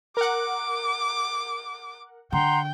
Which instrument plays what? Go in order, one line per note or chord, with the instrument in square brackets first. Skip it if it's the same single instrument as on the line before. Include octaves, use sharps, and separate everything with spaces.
[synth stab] A#4 F#5 [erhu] D6
[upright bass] D3 [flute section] F#5 A#5 C6 [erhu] G5